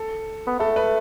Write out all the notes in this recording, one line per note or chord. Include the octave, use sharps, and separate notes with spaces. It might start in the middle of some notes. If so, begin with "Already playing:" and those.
Already playing: A4
B3
A3 A4
B4